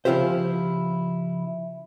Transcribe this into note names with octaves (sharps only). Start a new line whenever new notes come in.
C#3 F3 E4 F4 G4 C5